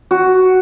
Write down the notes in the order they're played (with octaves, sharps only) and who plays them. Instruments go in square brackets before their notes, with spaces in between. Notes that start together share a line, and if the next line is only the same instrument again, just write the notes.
[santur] F#4